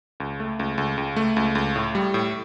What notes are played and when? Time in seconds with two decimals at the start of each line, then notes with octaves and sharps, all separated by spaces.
0.20 C#2
0.40 A3
0.59 C#2
0.78 C#2
0.98 C#2
1.16 A3
1.36 C#2
1.55 C#2
1.76 A2
1.95 G3
2.14 A2